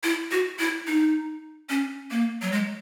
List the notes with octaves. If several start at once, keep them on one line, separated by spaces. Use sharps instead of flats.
E4
F#4
E4
D#4
C#4
A#3
F#3
G#3